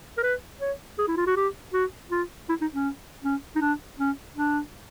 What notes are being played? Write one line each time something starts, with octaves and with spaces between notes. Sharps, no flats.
A#4
B4
C#5
G#4
E4
F4
F#4
G4
F#4
F4
E4
D#4
C#4
C#4
D#4
D4
C#4
D4